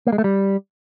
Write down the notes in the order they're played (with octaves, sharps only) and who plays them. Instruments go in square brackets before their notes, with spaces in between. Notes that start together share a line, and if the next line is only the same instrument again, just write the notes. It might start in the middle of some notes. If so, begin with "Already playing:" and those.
[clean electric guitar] A#3
G#3
A3
G3